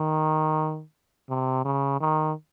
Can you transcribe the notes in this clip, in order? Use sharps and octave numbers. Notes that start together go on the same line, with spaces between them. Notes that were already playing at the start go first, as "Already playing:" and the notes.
Already playing: D#3
C3
C#3
D#3